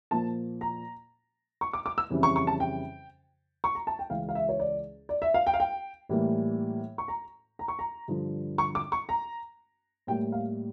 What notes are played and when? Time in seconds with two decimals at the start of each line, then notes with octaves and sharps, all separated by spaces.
0.11 A#2 F3 A#3 A5
0.61 A#5
1.61 C#6
1.73 D6
1.86 D6
1.98 E6
2.10 F2 C#3 E3 G3
2.23 C#6
2.36 C#6
2.47 A5
2.60 G5
3.64 C#6
3.75 A#5
3.87 A5
3.99 G5
4.10 C#2 C#3 E3 F5
4.29 F5
4.35 E5
4.49 C#5
4.60 D5
5.09 D5
5.22 E5
5.34 F5
5.47 G5
5.54 F5
5.60 G5
6.09 A2 E3 G3 A#3
6.98 C#6
7.08 A#5
7.59 A#5
7.68 C#6
7.79 A#5
8.08 G2 D3 F3
8.58 C#6
8.75 D6
8.92 C#6
9.09 A#5
10.07 A2 G3 A#3 G5
10.32 F5